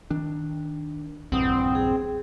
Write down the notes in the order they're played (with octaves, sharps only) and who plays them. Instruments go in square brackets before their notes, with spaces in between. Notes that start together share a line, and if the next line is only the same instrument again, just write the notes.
[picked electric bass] D#3 D4
[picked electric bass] A#1 E2 G2 [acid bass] C4 [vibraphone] F#5 D#6
[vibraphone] G#4